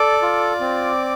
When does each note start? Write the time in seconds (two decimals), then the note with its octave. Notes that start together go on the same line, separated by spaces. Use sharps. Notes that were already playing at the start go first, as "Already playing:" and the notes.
Already playing: A4 D5 D6
0.22 F4
0.60 C4